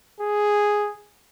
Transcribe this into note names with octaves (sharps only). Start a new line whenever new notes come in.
G#4